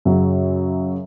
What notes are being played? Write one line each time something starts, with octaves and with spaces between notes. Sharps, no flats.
F#2 C#3 F#3